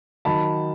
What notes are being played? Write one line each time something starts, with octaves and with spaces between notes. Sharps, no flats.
D#3 F#3 A5 B5